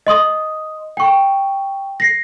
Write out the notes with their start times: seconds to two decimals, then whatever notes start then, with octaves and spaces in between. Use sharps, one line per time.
0.07 D#5 C6 D#6
0.97 G5 C#6
2.00 A#6 C7